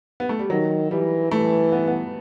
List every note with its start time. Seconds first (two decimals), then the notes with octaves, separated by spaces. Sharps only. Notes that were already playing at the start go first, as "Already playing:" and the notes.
0.20 B3
0.29 A3
0.39 G3
0.50 D#3 F#3
0.91 E3 G3
1.31 E3 A3
1.72 B3
1.88 B3